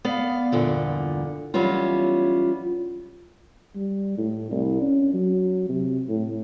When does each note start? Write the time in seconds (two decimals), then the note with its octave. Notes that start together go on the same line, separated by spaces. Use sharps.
0.05 B3 D5 F5
0.52 E2 G2 A#2 D3 F3
1.54 E3 F#3 G3 B3 C#4 F4
3.76 G3
4.18 A2
4.51 C2
4.82 C#4
5.14 F#3
5.69 C3
6.09 A2